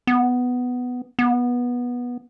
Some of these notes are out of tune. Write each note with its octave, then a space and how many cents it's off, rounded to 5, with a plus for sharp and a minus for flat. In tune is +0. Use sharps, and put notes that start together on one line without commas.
B3 +5
B3 -15